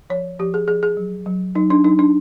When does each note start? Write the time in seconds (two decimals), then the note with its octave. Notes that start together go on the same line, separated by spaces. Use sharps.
0.10 F3 C#5
0.39 F3 G4
0.54 G#4
0.68 F3 G#4
0.83 G#4
0.97 F#3
1.26 F#3
1.55 F#3 D#4
1.70 D4
1.84 F#3 D#4
1.99 D4